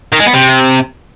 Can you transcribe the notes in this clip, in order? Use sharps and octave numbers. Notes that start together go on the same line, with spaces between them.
D#3
G#3
B3
C3